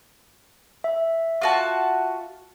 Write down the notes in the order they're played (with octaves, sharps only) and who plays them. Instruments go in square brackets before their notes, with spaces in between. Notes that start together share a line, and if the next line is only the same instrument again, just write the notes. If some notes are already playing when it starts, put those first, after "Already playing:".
[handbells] E5
[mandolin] F4 F#4 A5